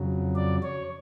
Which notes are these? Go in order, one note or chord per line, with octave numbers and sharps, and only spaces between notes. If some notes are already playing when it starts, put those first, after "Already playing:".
Already playing: F2 C#3 F#3
D5
C#5